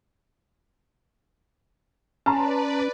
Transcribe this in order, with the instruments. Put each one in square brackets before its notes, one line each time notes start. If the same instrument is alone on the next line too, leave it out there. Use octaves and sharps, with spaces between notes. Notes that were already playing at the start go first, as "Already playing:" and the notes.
[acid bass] C#4 [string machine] B4 D5 [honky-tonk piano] A5 A#5 C6